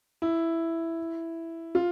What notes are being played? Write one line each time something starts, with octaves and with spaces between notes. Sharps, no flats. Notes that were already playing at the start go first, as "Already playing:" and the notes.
E4
F4